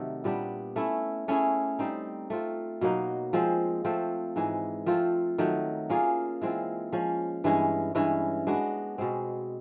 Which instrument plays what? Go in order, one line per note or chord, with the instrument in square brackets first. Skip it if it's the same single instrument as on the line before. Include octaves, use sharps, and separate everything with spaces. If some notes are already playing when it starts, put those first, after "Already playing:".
Already playing: [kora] C3 D#3 F#3 A3
A#2 G3 B3 D4
A3 C#4 E4
A3 C#4 E4 G#4
G3 C4 D#4
A3 C4 F4
B2 F#3 A#3 D#4
F3 G#3 C4
F3 A3 C4
G#2 E3 G#3
F3 A3 C4 F4
D#3 F#3 A3
A#3 C#4 F4 G#4
E3 G#3 C4 F4
F3 G#3 C#4
G2 E3 G#3 C#4
G2 E3 G#3 C#4
G#3 B3 D4 F#4
B2 G#3 C4